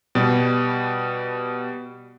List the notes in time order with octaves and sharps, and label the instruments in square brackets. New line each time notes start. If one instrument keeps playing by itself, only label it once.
[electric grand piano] B2 G3 B3